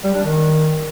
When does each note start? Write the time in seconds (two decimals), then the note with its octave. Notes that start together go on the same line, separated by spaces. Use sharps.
0.03 G3
0.14 D4
0.24 D#3